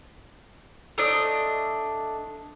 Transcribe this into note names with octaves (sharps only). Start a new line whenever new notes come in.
A3 D4 D#5